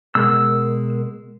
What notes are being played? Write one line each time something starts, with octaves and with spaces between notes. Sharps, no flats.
B2 G#3 A#4 E6